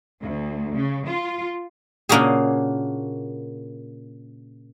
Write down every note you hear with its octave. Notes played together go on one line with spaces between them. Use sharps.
D2
C#3
F4
A#2 C#3 A#3 D4 F#4 G#4